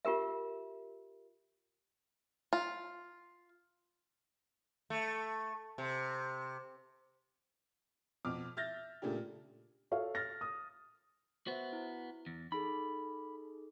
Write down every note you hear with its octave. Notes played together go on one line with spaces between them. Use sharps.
F4 G4 A#4 E5
F4
A3
C3
F2 B2 D6 F6
E5 F6 G6 A6 A#6
A#2 C#3 A3 D4 G4
F#4 A4 C#5 F5
F6 A6 A#6
D#6
B3 F#4 C5 E5
E4
E2
D#4 G#4 A4 B5